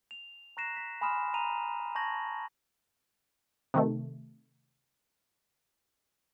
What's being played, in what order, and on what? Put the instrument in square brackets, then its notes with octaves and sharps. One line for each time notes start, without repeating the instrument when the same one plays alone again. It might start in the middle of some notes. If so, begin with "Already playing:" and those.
[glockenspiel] F7
A#5 C#6 F#6 A#6 C7 E7
B6
G#5 B5 C6 D#6 F6 E7
A#5 D#7 F7
A5 C#6 G6 G#6 A#6 F#7
[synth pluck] C3 D#3 A3